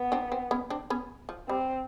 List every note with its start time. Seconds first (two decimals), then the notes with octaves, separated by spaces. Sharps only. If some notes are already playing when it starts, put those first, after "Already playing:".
Already playing: B3
0.12 C4 D4
0.32 C4
0.51 B3 C#4
0.70 C4 D4
0.90 B3 C#4
1.29 F3
1.49 G3 C4